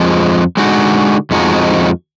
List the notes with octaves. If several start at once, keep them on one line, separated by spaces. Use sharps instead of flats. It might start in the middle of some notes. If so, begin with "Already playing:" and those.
Already playing: F2 F3 G#3
D3 G#3 D#4 F#4
F2 F3 G#3 D#4 F#4